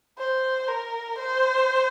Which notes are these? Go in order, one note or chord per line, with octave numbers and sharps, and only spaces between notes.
C5
A#4
C5